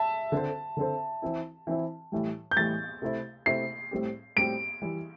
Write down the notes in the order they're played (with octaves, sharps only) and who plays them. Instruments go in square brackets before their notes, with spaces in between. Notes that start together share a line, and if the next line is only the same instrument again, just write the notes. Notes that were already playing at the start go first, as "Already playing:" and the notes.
Already playing: [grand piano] E5 A5
[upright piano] D3 C4 A4 C5
D3 C4 A4 C5
E3 C4 E4
E3 C4 E4
A2 E3 G3
[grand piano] G6
[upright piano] A2 E3 G3 [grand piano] A6
[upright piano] C3 A3 E4 C5
[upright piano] C3 A3 E4 C5 [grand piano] C7
[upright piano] A2 G3 C4 G4
[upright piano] A2 G3 C4 G4 [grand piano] D7
[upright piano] E3 G3 E4